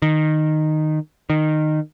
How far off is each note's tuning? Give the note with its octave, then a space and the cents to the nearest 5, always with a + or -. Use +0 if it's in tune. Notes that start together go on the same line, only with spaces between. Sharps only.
D#3 -10
D#3 -15